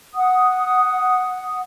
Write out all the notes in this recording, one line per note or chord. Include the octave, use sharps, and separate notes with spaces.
F#5 D#6